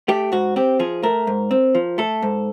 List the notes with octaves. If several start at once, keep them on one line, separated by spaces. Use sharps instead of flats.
A3 G4
G#2 F#4
C4 G4
F3 G#4
A3 A#4
G#2
C4
F3
A3 A4
G#2